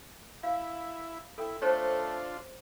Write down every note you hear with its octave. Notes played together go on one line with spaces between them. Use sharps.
E4 F5
E4 A4 G5
A3 D4 F4 C5 C#5